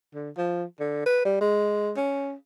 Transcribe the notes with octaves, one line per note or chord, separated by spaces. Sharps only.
D3
F3
D3
B4
G3
G#3
C#4